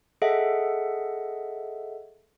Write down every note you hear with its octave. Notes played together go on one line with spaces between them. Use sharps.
G#4 A4 D#5 E5 F#5